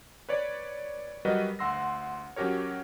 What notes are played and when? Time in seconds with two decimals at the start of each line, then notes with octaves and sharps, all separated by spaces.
0.29 B4 C#5 D5
1.25 F#3 G3 F#4 A#4 B4 D#5
1.59 D2 F#5 C6 E6 A#6
2.36 F#3 C#4 F#4 G4 A#4 C#5